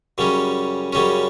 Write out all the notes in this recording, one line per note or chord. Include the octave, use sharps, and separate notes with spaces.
F#2 C#3 G3 C#4
F#2 C#3 G3 C#4